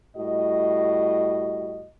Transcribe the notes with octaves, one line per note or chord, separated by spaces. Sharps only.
A2 G3 F#4 D#5